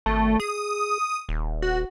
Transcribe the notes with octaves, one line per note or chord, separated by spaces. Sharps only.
G#1 A3
G#4 D#6
D#1
F#4